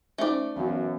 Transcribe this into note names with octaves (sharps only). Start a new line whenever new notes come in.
A3 C#4 D#4 C5 D5
F#2 E3 B3 C#4 F#4 F5